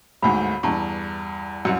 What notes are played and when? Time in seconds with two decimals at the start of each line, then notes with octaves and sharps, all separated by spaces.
0.22 G1 D2 G#2 B5
0.63 E2 G2 A5 A#5 C#6
1.65 C2 F#2 G4